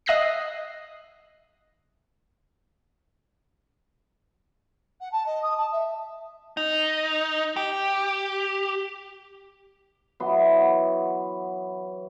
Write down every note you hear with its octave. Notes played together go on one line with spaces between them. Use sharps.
D#5 E5 D#6 F#6 A#6 C7
F#5
A5
D#5
D#6
A5
E5
D#4
G4
E3 F#3 B3 C6